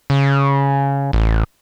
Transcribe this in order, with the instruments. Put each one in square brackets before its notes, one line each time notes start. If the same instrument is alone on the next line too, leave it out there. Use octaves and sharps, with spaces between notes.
[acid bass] C#3
A1